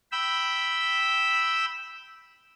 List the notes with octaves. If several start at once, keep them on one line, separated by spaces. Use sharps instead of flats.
G5 B5 E6